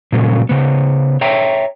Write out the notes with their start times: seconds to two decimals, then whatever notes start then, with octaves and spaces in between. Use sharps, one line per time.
0.12 A#2 C#3 F#3 G3
0.49 C#3 B3
1.21 C#5 E5 G5 A#5